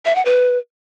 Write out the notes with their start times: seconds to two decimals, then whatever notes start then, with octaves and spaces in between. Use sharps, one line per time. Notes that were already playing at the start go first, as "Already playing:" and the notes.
0.06 E5
0.15 F#5
0.25 B4